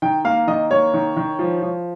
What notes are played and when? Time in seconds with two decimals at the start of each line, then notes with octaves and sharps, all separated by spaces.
0.02 D#3 G5
0.25 A#3 F5
0.47 D#3 D#5
0.71 A#3 C#5
0.94 D#3
1.17 D#3
1.39 F3
1.62 F3